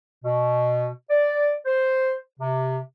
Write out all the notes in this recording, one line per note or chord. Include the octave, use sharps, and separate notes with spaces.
B2
D5
C5
C3